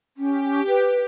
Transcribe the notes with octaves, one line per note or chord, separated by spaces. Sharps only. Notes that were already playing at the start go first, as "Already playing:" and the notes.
C#4 G4
B4